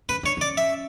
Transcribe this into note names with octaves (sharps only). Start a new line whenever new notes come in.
C#4 B4
D4 C#5
C#4 D5
E5